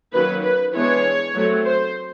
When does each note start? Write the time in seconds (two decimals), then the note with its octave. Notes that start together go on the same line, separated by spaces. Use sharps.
0.13 D#3 F#3 A#3 C#4 B4
0.43 B4
0.74 E3 G#3 B3 D4 C#5
1.35 F#3 A3 C4
1.65 C5